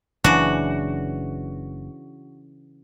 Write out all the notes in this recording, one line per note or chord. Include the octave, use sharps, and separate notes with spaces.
F#1 C#3 E3 D4 F#4